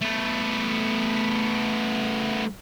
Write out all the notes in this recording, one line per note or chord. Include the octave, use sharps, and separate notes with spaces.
A3 B3